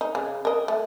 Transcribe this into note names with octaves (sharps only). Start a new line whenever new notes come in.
D#4
C#3
A#4 D#5
A3